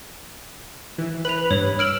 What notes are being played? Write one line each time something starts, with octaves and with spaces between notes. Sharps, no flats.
E3
B4 F7 F#7
G2 C#5
E6 F6 D7 F#7